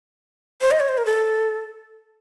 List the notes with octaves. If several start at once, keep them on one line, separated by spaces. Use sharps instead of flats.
C5
D#5
C#5
C5
A#4
A4